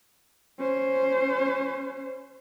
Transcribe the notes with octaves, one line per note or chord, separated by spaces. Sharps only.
C#4 C5